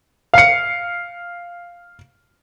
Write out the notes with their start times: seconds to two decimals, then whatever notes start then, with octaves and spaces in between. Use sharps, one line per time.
0.34 F5 C#7